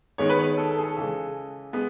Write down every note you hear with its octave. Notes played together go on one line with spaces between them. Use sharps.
D#3 G#3 B3 C#5
B4
C#5
A4
A4
G#4
A4
C#3 E3 G#3
G#3 B3